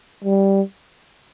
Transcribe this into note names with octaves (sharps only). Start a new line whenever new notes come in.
G3